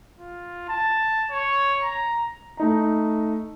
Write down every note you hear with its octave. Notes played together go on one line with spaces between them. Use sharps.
F4
A5
C#5
A#5
A3 D#4 A#5